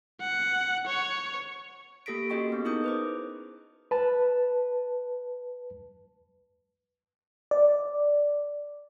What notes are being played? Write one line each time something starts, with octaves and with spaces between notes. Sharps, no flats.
F#5
C#5
A#3 G4 A4 A#6 B6 D7
C#4 F#4 G#4 D#5 G5 C#6
B3 C#4
D#4 E4 G#4 A#4 D#6 G6
B4 C5 D6
B4 A5
D5